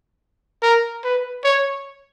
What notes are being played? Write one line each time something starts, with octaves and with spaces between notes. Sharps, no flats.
A#4
B4
C#5